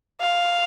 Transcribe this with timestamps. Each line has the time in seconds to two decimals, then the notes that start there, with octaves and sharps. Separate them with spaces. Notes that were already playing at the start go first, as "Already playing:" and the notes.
0.20 F5